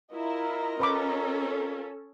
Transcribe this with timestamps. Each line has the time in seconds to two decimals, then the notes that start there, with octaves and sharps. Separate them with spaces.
0.12 E4 F4 A#4 D#5 A#5
0.80 C#4 A4 B4 B5 D6